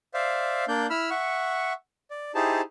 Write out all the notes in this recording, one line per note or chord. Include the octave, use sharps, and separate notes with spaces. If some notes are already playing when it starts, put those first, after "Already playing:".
C5 D5 E5 F5
A#3 D4 D5 G6
E4 B5 E6 F6
E5 F#5 C#6
D5
D#4 E4 G4 G#4 C5 A5